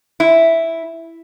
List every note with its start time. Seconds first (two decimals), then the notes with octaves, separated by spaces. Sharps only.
0.20 E4